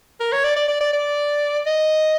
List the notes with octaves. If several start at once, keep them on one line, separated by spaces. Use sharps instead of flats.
A#4
C#5
D5
D5
D5
D5
D5
D#5